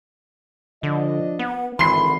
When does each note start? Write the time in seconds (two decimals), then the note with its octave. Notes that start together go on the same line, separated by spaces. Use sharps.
0.83 D3 F3 D4 D#5
1.39 B3 F#5
1.79 G#1 D3 E3 B5 C6 C7